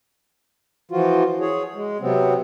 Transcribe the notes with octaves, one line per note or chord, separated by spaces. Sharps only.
E3 F3 F4 F#4
G#4 C#5
G#3
C3 F#3 B3 C4